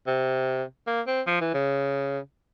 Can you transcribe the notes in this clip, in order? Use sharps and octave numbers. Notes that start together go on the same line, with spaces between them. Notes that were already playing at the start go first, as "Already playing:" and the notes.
C3
A#3
C4
F3
E3
C#3